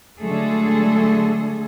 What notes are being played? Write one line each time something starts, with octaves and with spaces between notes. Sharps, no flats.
D3 F#3 G#3 A3 G#4 A4